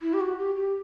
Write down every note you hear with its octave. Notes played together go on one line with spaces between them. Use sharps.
E4
G4
F#4
G4
G4